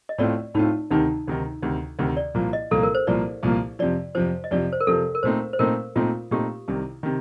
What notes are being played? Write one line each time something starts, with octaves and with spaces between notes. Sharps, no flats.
D#5
A2 A3 C4 F4 D5
A2 A3 C4 D#4 F4
D2 C3 D#3 D#4
D2 C3 D#3
D2 C3 D#3
D2 C3 D#3
D5
C2 A#2 F3 A#3
D#5
C2 A#2 F3 A#3 A4
A#4
C5
C2 A#2 F3 A#3 D5
C2 A#2 F3 A#3
F2 C3 F3 D5
F2 C3 F3 C5
D#5
F2 C3 F3 D5
C5
A#4
F2 C3 F3 A4
A#4
A#2 A3 C4 D#4 C5
C5
A#2 A3 C4 D#4 A#4
A#2 A3 C4 D#4 F4
A#2 A3 C4 D#4 G4
C2 C3 D#3
C3 D#3